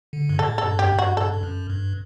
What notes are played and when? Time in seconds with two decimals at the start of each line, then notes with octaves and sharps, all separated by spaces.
0.13 D3
0.29 G2
0.39 A2 A4
0.58 A4
0.65 G2
0.79 F#2 G4
0.92 G2
0.99 F#4
1.17 G2 A4
1.33 G2
1.43 F#2
1.70 G2